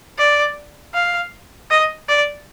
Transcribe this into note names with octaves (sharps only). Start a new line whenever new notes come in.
D5
F5
D#5
D5